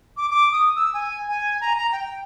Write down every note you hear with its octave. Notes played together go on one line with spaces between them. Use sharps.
D6
D6
D#6
E6
G#5
G#5
A#5
A#5
G5